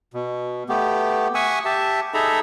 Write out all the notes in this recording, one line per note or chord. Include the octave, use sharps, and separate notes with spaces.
B2
A3 B3 G4
E5 F#5 G#5 C#6 D#6 E6
G4 E5 A5
D#4 G#4 A4 E5 A#5 B5